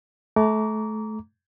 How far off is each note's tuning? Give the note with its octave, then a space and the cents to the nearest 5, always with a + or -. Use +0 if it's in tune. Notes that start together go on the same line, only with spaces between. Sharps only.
A3 -25 A#5 +0 D6 -25